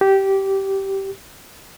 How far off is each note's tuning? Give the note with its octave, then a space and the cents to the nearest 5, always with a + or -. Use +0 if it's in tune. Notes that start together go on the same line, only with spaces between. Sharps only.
G4 -15